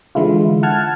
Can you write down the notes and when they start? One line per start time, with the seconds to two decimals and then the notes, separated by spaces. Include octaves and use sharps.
0.15 D3 E3 G#3 E4 F4
0.63 F#5 A5 F6 G#6